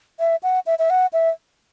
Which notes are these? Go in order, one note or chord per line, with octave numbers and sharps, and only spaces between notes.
E5
F#5
E5
E5
F#5
E5